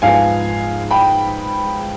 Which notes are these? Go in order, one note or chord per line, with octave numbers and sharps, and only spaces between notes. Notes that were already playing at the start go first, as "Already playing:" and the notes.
G#2 F3 B3 F5 G#5
G5 B5